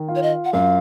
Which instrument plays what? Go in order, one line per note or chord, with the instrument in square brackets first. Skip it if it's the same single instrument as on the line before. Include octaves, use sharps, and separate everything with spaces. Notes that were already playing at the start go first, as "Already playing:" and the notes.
Already playing: [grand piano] D#3
F4
[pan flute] C#5
D#5
F#5
[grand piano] F#2 [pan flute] F5